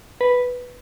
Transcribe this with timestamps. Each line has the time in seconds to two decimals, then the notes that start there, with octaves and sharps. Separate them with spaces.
0.21 B4